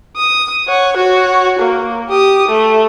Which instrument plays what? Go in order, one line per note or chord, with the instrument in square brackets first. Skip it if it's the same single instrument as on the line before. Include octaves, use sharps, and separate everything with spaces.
[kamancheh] D#6
C#5 F#5
F#4 C#5
A#3
G4 D#6
A3